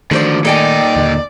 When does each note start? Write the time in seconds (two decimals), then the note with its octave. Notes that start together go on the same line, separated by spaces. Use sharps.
0.11 D3 D#3 F3 A3 F#4 C5 D5
0.45 A#2 D#4 A4 D5 G5 G#5
0.96 D#2 D3 D#3